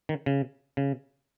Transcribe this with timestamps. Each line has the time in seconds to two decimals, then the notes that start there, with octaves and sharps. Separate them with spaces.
0.09 D#3
0.26 C#3
0.77 C#3